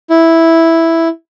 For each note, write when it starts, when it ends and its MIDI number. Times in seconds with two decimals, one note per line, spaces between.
0.10 1.08 64